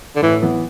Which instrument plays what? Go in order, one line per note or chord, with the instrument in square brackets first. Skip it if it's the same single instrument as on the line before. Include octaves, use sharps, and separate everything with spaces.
[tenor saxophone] D3
[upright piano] A2 [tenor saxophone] E3
[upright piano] E3 B3